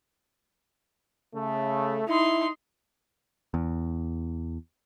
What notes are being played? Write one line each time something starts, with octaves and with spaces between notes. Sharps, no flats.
C#3 A3
D#4 E4 C6
E2